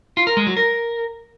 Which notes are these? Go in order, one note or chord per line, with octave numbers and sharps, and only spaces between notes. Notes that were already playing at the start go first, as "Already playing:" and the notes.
F4
A#4
G#3
F#3
A#4